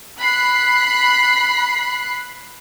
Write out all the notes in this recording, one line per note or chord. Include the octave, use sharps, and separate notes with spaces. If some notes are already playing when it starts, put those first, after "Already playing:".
B5 F#6 C7